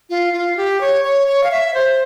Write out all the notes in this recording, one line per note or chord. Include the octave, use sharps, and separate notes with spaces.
F4
F4
G4
C#5
C#5
C#5
F5
E5
C5